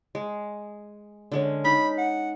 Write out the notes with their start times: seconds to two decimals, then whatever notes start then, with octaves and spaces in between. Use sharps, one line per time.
0.15 G#3
1.32 D3 G#3 C#4
1.65 D#4 B5
1.98 F#5